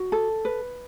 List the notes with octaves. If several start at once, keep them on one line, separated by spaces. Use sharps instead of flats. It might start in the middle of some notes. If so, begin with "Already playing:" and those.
Already playing: F#4
A4
B4